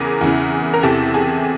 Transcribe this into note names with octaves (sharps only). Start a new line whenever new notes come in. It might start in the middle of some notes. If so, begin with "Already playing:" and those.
Already playing: E2 C#3 G#4 A#4
E2 C#3 E3
A#4
E2 C3 E3 G4 A4
G#4